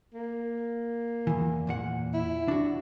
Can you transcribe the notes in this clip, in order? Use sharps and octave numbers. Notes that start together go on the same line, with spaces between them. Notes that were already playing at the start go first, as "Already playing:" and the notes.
A#3
E2 E3
E2 A#2 F#5
E4
D4 F#4